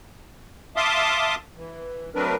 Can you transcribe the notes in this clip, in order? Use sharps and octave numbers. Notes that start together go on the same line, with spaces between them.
E5 F5 A5 C6 D6 D#6
E3
F#3 A3 C4 D4 A#4 B4